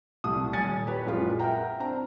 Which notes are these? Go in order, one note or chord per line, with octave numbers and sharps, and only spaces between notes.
C2 G3 A3 D#6
D#1 G#5 A6 C#7
G4 B4 C#5
A#1 F#2 G#3 F4 B4
A#4 E5 F#5 G5 A#5
C4 D4 A#5